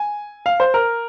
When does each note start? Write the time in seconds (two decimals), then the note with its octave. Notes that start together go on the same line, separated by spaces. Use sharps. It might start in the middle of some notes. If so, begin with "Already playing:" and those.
Already playing: G#5
0.46 F5
0.60 C5
0.74 A#4